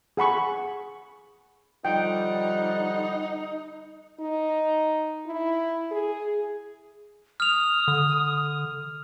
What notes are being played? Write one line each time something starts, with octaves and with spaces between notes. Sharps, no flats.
G#4 F#5 B5 C#6
D3 F3 G3 D#4 F#5 G5
D#4
E4
G#4
D#6 F6 F7
D3